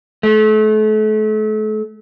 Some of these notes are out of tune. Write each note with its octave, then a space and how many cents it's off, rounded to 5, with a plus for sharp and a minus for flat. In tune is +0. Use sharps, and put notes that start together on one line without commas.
A3 -35